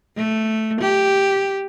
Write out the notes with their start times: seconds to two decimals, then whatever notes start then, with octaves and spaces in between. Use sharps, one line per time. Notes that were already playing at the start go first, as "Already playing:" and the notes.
0.16 A3
0.81 G4